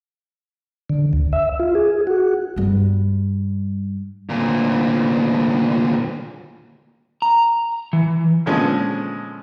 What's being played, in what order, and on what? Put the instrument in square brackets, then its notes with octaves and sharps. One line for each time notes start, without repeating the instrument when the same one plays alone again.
[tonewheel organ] D3
D2
E5
F4
G#4
F#4
[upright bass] G2 G3
[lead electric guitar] D2 A#2
[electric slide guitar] A#5
E3
[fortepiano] A#2 D3 F3 G#3 B3 C#4